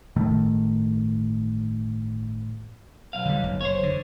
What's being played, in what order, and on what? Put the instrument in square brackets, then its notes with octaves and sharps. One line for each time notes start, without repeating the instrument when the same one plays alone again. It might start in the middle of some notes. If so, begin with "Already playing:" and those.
[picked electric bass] G1 A2 D#3 A3
[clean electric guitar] B1 F5
[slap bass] D3 G3
F#1
[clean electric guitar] C5 C#5
[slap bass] D3